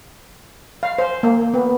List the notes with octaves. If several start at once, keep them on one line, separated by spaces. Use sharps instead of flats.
F5
C5
A#3
B3